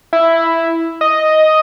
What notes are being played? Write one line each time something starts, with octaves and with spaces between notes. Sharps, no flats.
E4
D#5